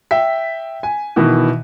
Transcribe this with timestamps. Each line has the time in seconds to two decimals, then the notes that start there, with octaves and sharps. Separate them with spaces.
0.11 E5 G5 B6
0.83 G#5
1.16 B2 D#3 E3